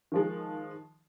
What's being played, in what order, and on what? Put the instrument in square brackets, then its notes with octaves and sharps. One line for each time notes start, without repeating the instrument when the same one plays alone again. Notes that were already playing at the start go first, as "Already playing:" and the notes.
[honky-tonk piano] D#3 F3 G#3